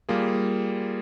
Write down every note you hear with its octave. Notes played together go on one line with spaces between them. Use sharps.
G3 A#3 F4 G#4